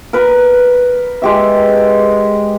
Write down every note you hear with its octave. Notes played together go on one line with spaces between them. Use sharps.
A#4 B4
G#3 G4 E5